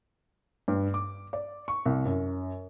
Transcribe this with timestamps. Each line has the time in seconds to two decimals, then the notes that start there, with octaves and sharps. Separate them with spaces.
0.68 G2
0.94 D6
1.33 D5
1.68 C#6
1.85 C2
2.05 F#2